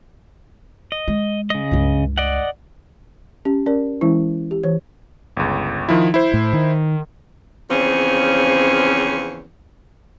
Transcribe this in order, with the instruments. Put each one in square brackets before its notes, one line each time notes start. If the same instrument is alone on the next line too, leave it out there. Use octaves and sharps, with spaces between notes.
[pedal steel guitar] D#5
[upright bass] G#3
[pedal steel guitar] C#3 D#5
[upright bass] C#2 G2
[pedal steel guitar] D5 D#5 F#5
[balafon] C#4 G4
C#4 A#4 D5
E3 G#3 C#4 E4
G4
E3 C#5
[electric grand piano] G1 C#2
D#3 F3 E4
E4 C5
[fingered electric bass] A2
D#3
[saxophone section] E2 C#3 F3 C4 C#4